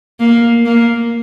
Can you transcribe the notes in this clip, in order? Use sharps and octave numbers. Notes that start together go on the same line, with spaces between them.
A#3
A#3